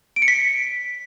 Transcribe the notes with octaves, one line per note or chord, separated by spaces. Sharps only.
D7
C#7
B6